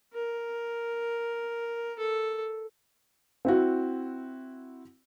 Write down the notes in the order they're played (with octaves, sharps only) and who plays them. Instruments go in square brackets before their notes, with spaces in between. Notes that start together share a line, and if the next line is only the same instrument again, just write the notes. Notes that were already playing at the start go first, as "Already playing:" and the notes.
[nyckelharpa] A#4
A4
[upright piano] C4 E4 F#4